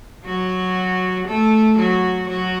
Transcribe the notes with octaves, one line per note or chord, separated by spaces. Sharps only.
F#3 F#4
A3 A4
F#3 F#4
F#3 F#4